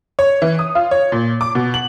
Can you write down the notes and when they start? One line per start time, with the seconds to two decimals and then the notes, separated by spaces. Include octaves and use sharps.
0.19 C#5
0.42 E3
0.59 D#6
0.75 F4
0.91 C#5
1.12 A#2
1.41 D6
1.55 B2
1.74 F#7